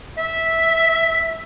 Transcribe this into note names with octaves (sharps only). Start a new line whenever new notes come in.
E5